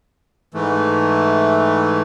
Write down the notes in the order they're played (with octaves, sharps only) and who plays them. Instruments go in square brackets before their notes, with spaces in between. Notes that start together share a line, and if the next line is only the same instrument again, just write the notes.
[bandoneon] G#2 E3 A3